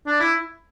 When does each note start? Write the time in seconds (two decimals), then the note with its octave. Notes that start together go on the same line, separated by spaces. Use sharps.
0.07 D4
0.20 E4